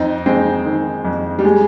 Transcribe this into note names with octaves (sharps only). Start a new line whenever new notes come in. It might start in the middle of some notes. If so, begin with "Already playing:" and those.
Already playing: F2 C4 D#4
F2 G#3 C4
D#3
F2
G3
G#3